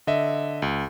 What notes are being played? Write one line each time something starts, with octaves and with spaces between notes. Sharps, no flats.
D3 D#5 E5
C#2